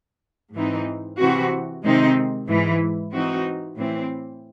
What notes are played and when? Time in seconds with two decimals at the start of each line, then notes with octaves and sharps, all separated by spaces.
0.54 G#2 E3 C4 D#4
1.19 C3 E3 C4 F#4
1.84 C3 D#3 G#3 C4 D#4
2.49 G#2 E3 G#3
3.13 E3 C4 D#4 F#4
3.77 A2 E3 C4